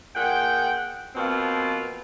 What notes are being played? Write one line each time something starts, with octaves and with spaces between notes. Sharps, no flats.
A#2 G#4 F#5 G5
B2 F3 A#3 C4 F4